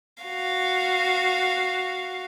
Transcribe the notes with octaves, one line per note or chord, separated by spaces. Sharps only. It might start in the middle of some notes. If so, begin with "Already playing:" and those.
F#4 F5